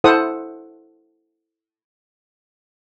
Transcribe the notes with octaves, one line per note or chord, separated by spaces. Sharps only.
E4 A4 C5 F#5 D#6